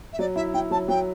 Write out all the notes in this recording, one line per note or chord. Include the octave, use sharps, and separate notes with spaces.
E5
F#3 D5
E4 E5
E4 G5
F#3 A5
F#3 G5